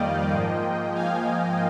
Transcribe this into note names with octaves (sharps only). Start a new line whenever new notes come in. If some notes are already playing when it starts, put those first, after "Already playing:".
Already playing: F2 D#3 G3 A#3 D5 D#5 F5 G5
G#2 F3 A#3
F5 G#5